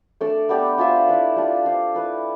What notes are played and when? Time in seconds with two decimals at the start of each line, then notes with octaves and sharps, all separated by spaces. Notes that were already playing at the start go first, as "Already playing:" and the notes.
0.21 A3 D4 A4 D5
0.49 B3 D4 G4 D5
0.78 D4 F4 C5 E5
1.08 E4 B4 D5
1.36 G3 D4 F4
1.66 D4 F4 C5 F5
1.95 E4 B4 E5